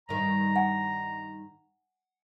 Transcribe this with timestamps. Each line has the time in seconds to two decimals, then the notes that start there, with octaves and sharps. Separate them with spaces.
0.09 G2 D#3 A#5
0.56 F#5 G#5